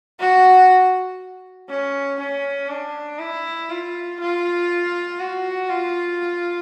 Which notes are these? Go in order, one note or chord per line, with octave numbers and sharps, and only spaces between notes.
F#4
C#4
C#4
D4
E4
F4
F4
F#4
F4